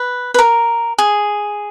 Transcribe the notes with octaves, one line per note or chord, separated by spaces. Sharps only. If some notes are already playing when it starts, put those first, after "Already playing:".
Already playing: B4
B4
A#4
G#4